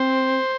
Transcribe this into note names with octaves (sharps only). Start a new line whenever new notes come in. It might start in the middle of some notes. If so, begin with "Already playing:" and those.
Already playing: C4 C5